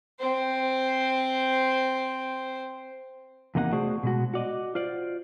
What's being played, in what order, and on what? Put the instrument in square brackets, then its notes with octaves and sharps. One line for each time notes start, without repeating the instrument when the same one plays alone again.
[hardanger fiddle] C4 C5
[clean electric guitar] E2 C3 A#3 D#4 G4 F#5
A3 F#4 G#4 C5 D5
B2 G#3 F#4
F#4 D5 D#5
F4 C5 D5